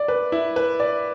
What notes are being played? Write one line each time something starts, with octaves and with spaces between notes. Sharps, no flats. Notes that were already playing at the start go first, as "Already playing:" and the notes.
Already playing: D5
B4
E4
B4
D5